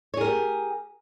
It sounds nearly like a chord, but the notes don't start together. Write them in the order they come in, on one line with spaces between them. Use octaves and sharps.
C#5 G#4 A#4 G4